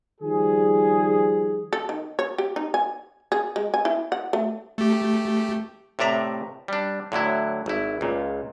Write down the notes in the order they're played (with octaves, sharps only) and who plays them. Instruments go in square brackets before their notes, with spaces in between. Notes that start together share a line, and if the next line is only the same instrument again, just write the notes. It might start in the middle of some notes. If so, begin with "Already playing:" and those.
[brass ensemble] D#3 F3 G3 G#4
[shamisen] A4
D#3
C#5
G4
D#4
G#5
G#4
G#3
G#5
E4
F#5
A3
[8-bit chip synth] A3 G4
[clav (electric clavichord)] A2 C3 D5 E5 A#5
G3 D4
A2 D3 F#3 E4
G#1 E4
C#2 A#2